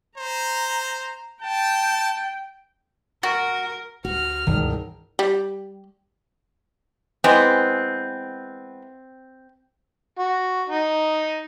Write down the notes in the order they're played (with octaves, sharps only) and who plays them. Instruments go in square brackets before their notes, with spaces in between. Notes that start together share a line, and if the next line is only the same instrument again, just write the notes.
[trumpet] C5 [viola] A#5
[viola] G5 [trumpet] A5
[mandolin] F#4 [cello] A#4
[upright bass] D2 [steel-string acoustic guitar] F#4 [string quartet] F6
[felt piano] E1 [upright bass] C#2 G2 [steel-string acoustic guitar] D#3
[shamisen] G3
[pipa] E3 G#3 B3 [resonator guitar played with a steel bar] C4
[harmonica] F#4
D#4